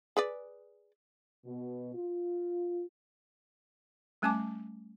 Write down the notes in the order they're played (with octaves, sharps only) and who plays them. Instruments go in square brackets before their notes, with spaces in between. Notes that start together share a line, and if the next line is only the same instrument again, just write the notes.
[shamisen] G#4 B4 D5
[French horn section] B2
F4
[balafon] G3 A3 C#4 G#5 A5 D6